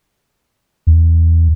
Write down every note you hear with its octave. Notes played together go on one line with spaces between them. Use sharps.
E2